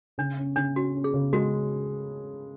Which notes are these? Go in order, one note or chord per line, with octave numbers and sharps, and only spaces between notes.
C#3 D4
C#4
C#3 D4
C#4 F#4
C#4
G#4
C#3
G#3 F#4